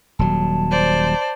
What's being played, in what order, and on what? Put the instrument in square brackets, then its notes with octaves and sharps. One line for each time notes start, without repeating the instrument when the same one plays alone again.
[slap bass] D#1 F#3 [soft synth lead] A5
[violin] C5 D5